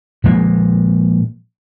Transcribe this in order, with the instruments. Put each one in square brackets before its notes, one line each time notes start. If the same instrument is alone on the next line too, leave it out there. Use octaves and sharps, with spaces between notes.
[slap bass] A#2 F3 G#3 A#3